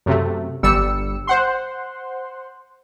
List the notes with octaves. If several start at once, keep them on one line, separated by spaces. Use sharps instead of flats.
F#2 C3 A3
G1 G3 E6 C#7
C5 F#5 C6